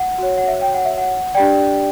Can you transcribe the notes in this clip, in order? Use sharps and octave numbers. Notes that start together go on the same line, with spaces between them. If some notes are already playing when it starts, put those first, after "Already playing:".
Already playing: F#5
F#4 C#5
F#5
E5
G5
F#5
E5
F#5
D4 G4 D5 G5